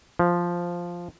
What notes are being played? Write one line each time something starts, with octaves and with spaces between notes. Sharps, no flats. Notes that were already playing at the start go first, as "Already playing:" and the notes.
F3